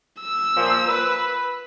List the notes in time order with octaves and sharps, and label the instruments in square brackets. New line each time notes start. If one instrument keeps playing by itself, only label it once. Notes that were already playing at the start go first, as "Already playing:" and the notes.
[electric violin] E6
[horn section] A#2 F3
B4